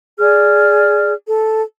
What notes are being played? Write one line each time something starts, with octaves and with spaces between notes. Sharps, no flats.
G#4 D5 F6
A4